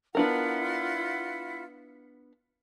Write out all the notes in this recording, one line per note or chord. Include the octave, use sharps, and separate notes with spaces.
B3 D4 E4 F4 A#4 F#5